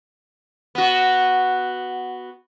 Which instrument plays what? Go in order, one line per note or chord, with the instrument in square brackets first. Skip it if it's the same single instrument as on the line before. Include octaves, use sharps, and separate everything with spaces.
[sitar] B3 F#4